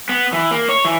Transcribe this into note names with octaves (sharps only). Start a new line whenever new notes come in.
B3
E3
A#3
C#5
E3